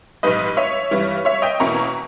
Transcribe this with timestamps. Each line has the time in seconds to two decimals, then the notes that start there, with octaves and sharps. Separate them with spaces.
0.23 A#1 G#2 G3 B4 D#5
0.57 C#5 E5
0.91 G2 E3 G3
1.25 C#5 E5
1.42 D#5 G5
1.60 E2 B2 A#3 C#4 E4 A#5 C#6